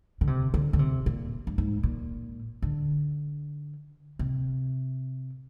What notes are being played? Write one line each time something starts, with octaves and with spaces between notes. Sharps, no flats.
D3
C3
D3
D3
C3
A#2
G2
G#2
A#2
D3
C3